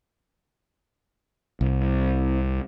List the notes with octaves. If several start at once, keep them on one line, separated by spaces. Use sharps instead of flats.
C2